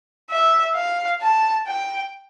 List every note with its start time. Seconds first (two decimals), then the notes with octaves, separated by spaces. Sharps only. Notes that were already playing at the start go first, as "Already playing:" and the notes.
0.30 E5
0.75 F5
1.21 A5
1.67 G5